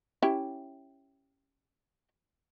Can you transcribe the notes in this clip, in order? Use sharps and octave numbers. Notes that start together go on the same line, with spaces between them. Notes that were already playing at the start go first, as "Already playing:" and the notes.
C#4 E4 G4